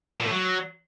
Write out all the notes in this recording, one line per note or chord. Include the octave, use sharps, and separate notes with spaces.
A#2
A2
F#3